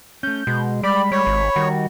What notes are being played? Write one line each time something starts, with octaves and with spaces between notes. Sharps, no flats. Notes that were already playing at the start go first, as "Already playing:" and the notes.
A3 C#4 G6
B2 G#3
G3 D5 B5
G3 C#5
G#1
D#3 G3 F#4